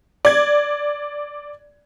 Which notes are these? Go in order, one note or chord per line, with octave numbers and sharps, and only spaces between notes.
D5 G#6